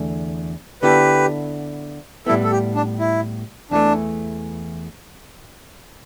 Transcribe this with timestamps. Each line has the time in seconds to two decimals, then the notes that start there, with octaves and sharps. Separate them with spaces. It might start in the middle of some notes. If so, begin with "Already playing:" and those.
Already playing: E2 D3 A3
0.82 D3 B3 E4 G4 A4 B4
2.26 A2 G3 B3 E4 A4
2.44 A4
2.51 G4
2.75 D4
2.99 E4
3.71 E2 E3 A3 D4